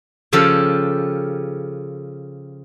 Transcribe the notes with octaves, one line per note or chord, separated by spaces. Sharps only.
C#3 F3 G4 A4